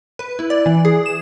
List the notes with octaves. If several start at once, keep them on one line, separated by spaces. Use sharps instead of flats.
B4
E4
D5
E3
G#4
E7